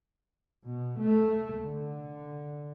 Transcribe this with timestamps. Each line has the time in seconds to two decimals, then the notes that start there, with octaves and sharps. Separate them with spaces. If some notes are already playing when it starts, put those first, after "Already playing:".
0.67 B2
1.00 A3
1.64 D3